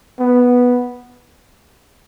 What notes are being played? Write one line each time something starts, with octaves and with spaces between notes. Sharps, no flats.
B3